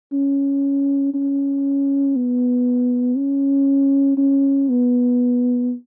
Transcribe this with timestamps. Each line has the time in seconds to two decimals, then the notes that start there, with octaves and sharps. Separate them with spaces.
0.12 C#4
1.14 C#4
2.15 B3
3.17 C#4
4.17 C#4
4.69 B3